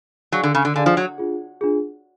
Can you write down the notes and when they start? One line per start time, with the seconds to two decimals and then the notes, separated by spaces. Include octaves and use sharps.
0.32 F#3 D4 G#4 D5 F5 G#5
0.43 D3
0.55 C#3
0.65 D3
0.75 D3 D4 G#4 D5 F5 G#5
0.86 F3
0.97 F#3
1.18 D4 F4 G#4
1.61 D4 F4 G#4